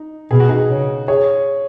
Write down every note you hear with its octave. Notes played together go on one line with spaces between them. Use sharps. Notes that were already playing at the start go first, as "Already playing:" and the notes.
Already playing: D#4
B2 G#4
F#4
D#4 G#4
C#3
G#4 C#5